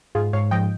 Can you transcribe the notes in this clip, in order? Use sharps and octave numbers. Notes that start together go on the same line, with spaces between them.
G#2 F4 G#4
G#2 C#5 F5
F3 D#5 G5